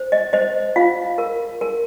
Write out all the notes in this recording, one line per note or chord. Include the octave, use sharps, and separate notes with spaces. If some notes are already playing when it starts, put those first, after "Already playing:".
Already playing: C5
D#5
C5 D#5
F4 F5
A#4
A#4